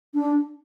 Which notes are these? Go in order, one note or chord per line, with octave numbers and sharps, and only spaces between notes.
D4